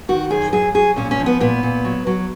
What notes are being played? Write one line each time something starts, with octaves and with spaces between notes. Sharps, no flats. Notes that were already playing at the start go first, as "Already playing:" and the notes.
D#3 F#4
F#2 G#4
F#3 G#4
F#3 G#4
A#2 C#4
C#4
F3
B3
A#2 B3
A#2
F#3
F#3